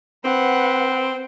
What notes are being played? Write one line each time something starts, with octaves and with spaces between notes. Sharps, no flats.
C4 B4 F#5